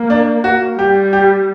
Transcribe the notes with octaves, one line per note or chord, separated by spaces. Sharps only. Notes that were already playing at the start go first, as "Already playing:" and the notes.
Already playing: A#3
D4
F#4
G3 G4
G4